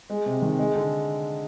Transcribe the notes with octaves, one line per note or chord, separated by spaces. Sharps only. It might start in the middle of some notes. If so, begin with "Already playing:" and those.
G#3
C3
D#3
G#3
D3